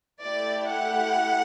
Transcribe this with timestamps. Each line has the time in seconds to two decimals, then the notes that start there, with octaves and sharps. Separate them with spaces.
0.23 A3 E4 G4 D5
0.71 F#5